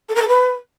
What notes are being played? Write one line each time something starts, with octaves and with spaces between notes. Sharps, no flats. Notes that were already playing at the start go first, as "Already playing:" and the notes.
A4
A#4
A4
B4